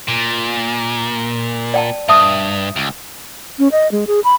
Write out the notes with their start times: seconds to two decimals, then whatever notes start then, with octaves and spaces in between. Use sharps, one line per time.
0.08 A#2
1.74 D5 G5 A5
2.09 G2 E5 A5 D#6
2.76 C#2
3.59 C#4
3.72 D#5
3.92 G#3
4.07 G#4
4.24 B5